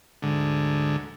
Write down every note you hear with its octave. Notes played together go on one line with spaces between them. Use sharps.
D2 G#2 D3